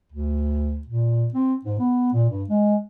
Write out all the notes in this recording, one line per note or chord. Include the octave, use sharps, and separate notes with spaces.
D2
A#2
C4
G#2
B3
A#2
G2
G#3